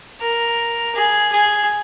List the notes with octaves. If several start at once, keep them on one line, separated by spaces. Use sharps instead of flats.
A#4
G#4
G#4